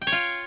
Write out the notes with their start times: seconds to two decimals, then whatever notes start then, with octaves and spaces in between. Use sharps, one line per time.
0.02 G5
0.07 C#5
0.12 F4